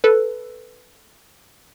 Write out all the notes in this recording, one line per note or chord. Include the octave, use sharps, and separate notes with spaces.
A4 B4